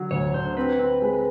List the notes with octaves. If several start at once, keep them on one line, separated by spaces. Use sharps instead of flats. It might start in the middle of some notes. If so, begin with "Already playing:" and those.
Already playing: D3 F#3
D2 C#5
D3 C5
C4 B4
C4
G#3